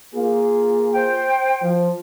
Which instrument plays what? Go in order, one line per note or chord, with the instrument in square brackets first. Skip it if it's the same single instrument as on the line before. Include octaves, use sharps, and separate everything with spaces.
[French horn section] A#3 F4 G#4
[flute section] C5 G5
[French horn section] F3